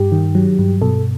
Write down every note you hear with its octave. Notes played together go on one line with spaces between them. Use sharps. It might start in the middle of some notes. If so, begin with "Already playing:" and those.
Already playing: G2 G4
D#3
F#3
G2
B2 A4